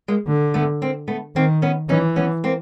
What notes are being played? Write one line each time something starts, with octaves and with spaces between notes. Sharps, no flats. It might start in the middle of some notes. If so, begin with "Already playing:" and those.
G#3 A#3
D3
A3 B3
A#3 C4
A3 B3
D#3 A#3 C4
B3 C#4
E3 C#4 D#4
B3 C#4
A#3 C4